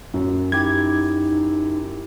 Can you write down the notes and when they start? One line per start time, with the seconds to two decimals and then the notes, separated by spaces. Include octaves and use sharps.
0.14 F#2
0.52 D#4 E4 G4 G#6